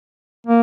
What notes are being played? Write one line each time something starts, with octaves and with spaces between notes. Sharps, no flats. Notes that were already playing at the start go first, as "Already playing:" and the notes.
A#3